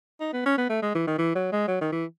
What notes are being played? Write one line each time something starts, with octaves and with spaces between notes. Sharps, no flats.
D#4
B3
C#4
B3
A3
G#3
E3
D#3
E3
F#3
G#3
F#3
D#3
E3